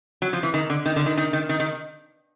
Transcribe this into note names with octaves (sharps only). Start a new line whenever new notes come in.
F#3
F3
E3
D#3
D3
D#3
D3
D#3
D#3
D#3
D#3
D#3